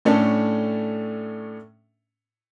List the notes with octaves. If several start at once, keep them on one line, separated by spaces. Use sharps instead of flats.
A2 A3 C#4 D4 A4